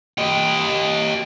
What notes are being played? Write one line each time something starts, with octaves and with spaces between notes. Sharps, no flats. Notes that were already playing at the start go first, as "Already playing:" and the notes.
G4 D#5